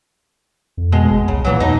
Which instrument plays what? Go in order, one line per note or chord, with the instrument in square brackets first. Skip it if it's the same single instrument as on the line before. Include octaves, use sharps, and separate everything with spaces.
[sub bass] F2
[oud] B2 G#3 D#5
[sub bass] G1
[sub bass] C2 [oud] C#3
[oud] A#2 E3 F#3
[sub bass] E2 [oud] B2 D#4